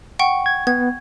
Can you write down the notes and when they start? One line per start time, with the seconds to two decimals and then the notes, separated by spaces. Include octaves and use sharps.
0.19 F#5 G5 C#6
0.46 G#6
0.67 B3 G#6